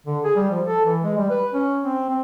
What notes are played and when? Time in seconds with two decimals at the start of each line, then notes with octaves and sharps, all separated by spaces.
0.06 D3
0.24 G#4
0.36 G3
0.51 F3
0.66 A4
0.85 E3
1.04 G#3
1.18 G3
1.30 B4
1.54 C#4
1.83 C4
2.09 C4